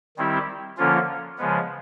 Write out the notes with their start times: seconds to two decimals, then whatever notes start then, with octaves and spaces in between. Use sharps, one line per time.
0.17 D#3 G3 C4 E4 G4
0.77 D3 F3 A#3 C#4 F4
1.38 C#3 F3 G#3 B3